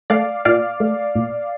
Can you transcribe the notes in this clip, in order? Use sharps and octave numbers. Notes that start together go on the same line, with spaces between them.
A3 D5 F5
A#2 D5 F5
A3
A#2